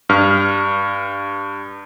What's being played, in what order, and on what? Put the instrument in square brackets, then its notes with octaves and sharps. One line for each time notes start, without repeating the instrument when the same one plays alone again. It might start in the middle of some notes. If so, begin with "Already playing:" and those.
[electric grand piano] G2 F6